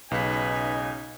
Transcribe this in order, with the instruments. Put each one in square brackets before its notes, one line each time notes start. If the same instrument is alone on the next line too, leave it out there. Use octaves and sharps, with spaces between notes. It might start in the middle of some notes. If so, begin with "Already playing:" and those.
[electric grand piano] B1 [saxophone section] C#3 D#4 [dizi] B4 [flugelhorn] G#5